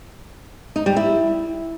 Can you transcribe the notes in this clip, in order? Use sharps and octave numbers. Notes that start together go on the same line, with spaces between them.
D#4
G3
E4